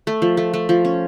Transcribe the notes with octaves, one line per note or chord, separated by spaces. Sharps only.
A3
F3
A3
A3
F3
C#4